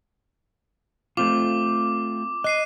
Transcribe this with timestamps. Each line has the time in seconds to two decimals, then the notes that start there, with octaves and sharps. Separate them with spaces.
1.17 A3 C4 F4 D6
2.44 D#5 F#6 C7 D#7